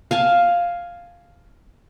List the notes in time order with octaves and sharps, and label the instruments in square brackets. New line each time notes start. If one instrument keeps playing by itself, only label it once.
[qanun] F5 G#5 A5